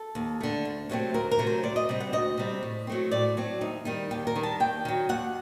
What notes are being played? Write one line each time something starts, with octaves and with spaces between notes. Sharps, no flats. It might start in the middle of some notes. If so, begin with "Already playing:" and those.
Already playing: A4
D#2
D3 A3
D2
C3 F#3 A3 C4
D2 A#4
A#4
C3 F#3 A3 C4
C5
D2 D5
D#5
C3 G3 C4
F#5
D2 D#5
C3 G3 C4
A2
F#3 A3 C4
A2 D5
F#3 A3 C4
D#2 D#4
D#3 G3 D#4
D#2 G4
A#4
D#3 G3
A5
D#2 G5
D#3 F#3
D#2 F#5